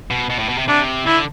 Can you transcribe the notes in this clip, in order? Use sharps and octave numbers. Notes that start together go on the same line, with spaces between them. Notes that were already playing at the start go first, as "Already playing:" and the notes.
B2
B2
A2
B2
C3
C3 D4
D3 E4